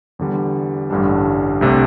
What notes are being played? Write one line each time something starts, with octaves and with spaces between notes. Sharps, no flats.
E2 D3 G3
A1 G2 D3 G3 D4
C2 C3 A3 D4